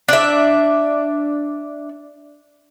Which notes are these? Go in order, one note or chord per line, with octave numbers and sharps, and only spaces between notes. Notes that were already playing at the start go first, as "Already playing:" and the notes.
D4 E5